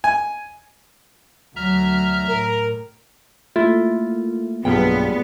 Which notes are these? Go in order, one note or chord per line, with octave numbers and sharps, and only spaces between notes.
G#5
D2 F#3 E5 A#5 F6
A2 A#4
A3 A#3 E4 F4
B1 G2 G3 B3 F4 G#4 G5